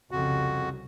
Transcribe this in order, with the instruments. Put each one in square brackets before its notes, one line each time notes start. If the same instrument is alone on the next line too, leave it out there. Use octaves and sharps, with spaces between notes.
[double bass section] C2 C#3 [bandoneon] F2 F#4